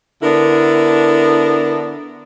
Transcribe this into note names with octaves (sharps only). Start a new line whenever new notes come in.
D3 B3 D4 E4 A#4